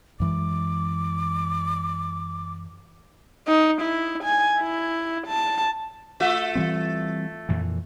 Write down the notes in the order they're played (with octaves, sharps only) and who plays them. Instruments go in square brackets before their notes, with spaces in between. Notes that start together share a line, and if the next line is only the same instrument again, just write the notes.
[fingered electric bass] F#2 E3 G#3 [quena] D6
[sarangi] D#4
E4
G#5
E4
A5
[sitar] A3 F4 E5
[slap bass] E3 G3 C4
F2 A#2 E3